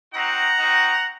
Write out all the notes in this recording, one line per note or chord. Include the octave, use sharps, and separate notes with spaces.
C4 D#4 F#4 F#5 A#5
C4 D#4 F#4